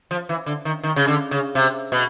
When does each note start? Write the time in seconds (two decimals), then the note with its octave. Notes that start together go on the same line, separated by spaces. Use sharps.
0.11 F3
0.29 E3
0.46 D3
0.65 D#3
0.83 D#3
0.96 C#3
1.07 D3
1.31 C#3
1.55 C3
1.92 B2